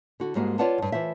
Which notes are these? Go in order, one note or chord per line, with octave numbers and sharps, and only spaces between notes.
D3 F#4
G#2 G3 G#3 A#3 F#4
F4 B4 C#5 D5 F#5 A5
E2 G2
E3 F4 C5 E5